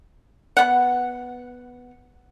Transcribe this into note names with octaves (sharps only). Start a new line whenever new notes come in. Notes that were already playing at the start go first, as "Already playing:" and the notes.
B3 F#5